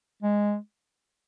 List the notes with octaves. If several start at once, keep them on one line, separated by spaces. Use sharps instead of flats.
G#3